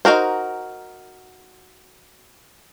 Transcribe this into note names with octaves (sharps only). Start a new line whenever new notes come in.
D#4 F#4 A#4 C5